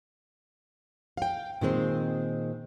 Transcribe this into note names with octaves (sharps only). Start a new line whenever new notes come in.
F5 G5
A#2 D#3 G#3 C4